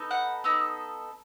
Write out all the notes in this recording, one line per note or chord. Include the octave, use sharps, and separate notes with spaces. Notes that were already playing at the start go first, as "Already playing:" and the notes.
Already playing: B3 D#4 A4
F#5
B3 D#4 A4 E6